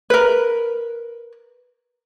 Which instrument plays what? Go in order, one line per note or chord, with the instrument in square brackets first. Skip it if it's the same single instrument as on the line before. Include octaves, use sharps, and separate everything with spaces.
[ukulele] A#4 B4